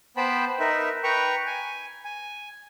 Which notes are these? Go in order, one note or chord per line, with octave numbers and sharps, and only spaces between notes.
B3 C5 G5 A5 B5
D#4 A#4 B4 E5
B4 G5 A#5 C#6
G#5
G#5